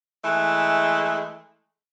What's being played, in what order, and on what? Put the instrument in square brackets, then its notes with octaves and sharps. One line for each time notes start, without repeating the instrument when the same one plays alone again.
[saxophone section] E3 G#3 A3